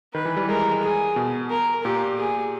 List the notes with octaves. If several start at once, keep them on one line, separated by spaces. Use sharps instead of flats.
D#3 B4
E3
G3
G#3 A#4
G#4
B2
A#4
A#2 G4
G#4